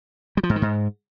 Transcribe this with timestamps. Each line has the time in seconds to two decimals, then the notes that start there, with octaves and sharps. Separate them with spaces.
0.37 G3
0.43 F3
0.50 G#2
0.56 D#3
0.62 G#2